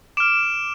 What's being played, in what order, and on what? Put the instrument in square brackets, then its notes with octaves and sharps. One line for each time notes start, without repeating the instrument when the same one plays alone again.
[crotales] D6 F6 D7 E7